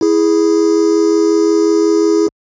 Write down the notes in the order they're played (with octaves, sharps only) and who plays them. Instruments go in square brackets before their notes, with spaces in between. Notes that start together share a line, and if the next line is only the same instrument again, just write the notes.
[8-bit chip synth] E4 G#4